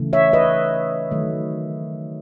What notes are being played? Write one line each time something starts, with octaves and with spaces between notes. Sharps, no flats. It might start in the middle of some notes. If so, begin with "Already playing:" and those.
Already playing: C#3 E3 A3
C#5 E5
B4 D#5
D#3 F#3 A3